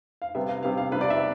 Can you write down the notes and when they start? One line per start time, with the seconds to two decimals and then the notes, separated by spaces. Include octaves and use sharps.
0.22 F5
0.35 C3 G3 B3 E5
0.49 F5
0.63 C3 G3 B3 F5
0.77 F5
0.91 C3 G3 B3 B4
1.01 D5
1.10 E5